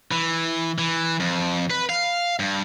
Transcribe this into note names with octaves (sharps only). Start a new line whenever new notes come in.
E3
E3
F2
B4
F5
G2